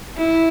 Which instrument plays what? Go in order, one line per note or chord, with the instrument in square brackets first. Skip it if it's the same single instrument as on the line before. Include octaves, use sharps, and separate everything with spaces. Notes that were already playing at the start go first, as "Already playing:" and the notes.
[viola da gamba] E4